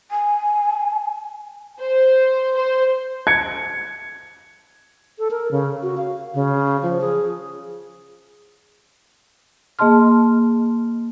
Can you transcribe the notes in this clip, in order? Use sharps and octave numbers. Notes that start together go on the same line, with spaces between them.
G#5
C5
C5
G#6 C#7
A4
A#4
C#3
F#4
F5
C#3
F3
G#4
A#3 G#4 D#5 A5 C6 F6